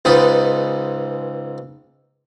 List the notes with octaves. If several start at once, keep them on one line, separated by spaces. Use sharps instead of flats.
C#2 G#2 D#4 B4